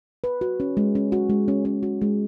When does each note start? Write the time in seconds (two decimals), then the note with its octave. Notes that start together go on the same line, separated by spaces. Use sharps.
0.24 B4
0.41 F#4
0.60 C#4
0.77 G#3
0.95 C#4
1.12 F#4
1.30 G#3
1.48 C#4
1.65 C#4
1.83 F#4
2.02 G#3